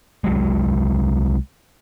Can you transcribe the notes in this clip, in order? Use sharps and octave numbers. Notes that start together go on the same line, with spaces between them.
C2 F#3 G#3